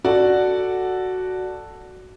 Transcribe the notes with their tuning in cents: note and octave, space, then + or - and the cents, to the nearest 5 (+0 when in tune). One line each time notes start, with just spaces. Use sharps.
F#4 +0 A4 +5 D5 +0